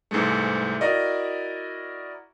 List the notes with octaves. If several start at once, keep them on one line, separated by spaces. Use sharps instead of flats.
C2 G#2 E3 G#3 A3
E4 F#4 A#4 D5 D#5